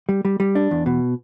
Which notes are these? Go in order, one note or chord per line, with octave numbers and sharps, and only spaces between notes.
G3
G3
G3
D4
E2
B2